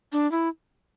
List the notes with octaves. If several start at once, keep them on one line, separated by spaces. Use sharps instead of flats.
D4
E4